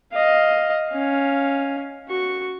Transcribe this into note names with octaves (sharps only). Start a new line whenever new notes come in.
D#5 F5
C#4 F5
F#4 C#6